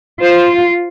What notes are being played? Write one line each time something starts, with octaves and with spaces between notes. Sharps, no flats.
F4 C5